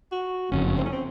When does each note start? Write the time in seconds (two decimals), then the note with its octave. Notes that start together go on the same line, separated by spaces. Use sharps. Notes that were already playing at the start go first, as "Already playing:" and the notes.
0.12 F#4
0.52 F#1 F2 C#3 C#4
0.78 C4
0.85 C#4
0.92 C4